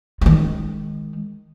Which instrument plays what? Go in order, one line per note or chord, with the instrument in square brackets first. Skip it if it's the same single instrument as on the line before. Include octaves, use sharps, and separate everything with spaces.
[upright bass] D#3 G#3